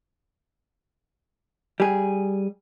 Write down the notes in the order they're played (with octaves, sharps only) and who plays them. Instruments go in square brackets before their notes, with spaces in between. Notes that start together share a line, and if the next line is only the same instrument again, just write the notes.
[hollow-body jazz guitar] G3 G#4